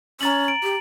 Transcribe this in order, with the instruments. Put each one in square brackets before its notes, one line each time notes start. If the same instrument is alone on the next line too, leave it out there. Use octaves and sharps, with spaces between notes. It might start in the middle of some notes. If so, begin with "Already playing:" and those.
[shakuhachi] C#4 [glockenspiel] A#5 A6 F#7
[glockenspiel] D7
[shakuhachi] G4